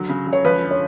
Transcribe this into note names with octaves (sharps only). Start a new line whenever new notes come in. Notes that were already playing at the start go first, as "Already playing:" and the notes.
Already playing: D3 F#3
C#3
C#3
C#5
F3 B4
D3
C#5